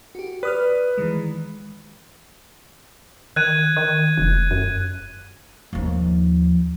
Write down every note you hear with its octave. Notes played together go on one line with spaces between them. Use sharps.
F#4 G4
B4 D5 D#6 F6
D#3 E3 G#3
D#3 F#6 G#6 D#7
D#3
F1
F#2
D#2 F3